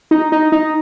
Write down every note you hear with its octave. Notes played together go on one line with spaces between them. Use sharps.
D#4
D#4
D#4